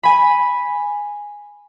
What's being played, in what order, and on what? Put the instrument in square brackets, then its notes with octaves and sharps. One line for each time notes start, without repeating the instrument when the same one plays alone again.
[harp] G#5 B5